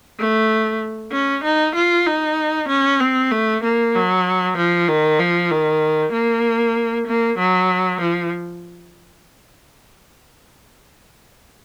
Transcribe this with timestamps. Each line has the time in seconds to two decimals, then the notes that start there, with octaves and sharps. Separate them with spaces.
0.19 A3
1.12 C#4
1.43 D#4
1.75 F4
2.06 D#4
2.68 C#4
3.00 C4
3.31 A3
3.63 A#3
3.95 F#3
4.57 F3
4.88 D#3
5.19 F3
5.50 D#3
6.13 A#3
7.07 A#3
7.39 F#3
8.01 F3